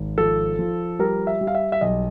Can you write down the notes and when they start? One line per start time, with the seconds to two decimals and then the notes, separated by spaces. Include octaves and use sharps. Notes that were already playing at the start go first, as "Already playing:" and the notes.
Already playing: G#1
0.18 F3 A4
0.59 F3
0.99 G3 A#4
1.27 E5
1.41 G3
1.47 F5
1.55 E5
1.72 E5
1.81 B1 D#5